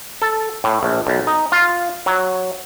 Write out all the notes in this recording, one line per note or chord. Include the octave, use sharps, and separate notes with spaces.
A4
A2
A#1
B1
D#4
F4
F#3